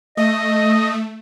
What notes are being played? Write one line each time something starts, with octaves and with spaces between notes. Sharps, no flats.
A3 D#5 D#6